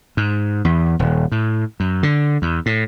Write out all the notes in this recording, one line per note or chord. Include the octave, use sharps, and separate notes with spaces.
G#2
E2
D#1
A2
F#2
D3
E2
A2